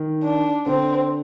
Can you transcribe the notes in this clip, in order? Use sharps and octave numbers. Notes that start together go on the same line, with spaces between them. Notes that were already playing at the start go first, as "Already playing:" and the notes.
Already playing: D#3
D4
D3 C4